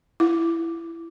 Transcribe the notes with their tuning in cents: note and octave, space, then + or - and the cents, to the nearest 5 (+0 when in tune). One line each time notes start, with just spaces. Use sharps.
E4 +15